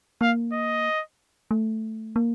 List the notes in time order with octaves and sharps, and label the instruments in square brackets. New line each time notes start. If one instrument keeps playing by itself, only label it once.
[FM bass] A#3 [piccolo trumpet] F5
[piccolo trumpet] D#5
[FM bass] A3
A#3